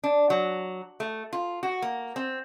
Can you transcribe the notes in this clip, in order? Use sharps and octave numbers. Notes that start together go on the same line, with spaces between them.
D4
F#3
A3
F4
F#4
A#3
C4